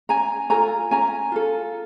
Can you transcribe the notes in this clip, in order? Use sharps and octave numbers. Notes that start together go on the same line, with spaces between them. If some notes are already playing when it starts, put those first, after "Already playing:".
C#4 G#5 A#5
F4 A4 G#5 A#5
C#4 G#5 A#5
F4 A4